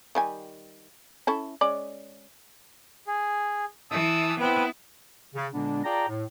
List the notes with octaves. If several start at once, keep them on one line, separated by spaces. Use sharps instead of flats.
D#3 G3 G#5
C#4 E4 A4
G#3 C#4 D5
G#4
E3 A5 D#6 E6
B3 C4 E4 B4
C#3
A#2 D3 G#3 B3 D4
F4 G#4 D5 G5 A5 A#5
A2